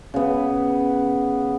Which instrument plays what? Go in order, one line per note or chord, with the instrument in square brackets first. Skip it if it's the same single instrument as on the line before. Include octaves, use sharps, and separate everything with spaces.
[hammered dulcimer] C#3 B3